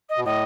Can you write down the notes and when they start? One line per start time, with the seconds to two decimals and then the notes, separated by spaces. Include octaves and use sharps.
0.09 D#5
0.17 B2
0.25 A2 D#5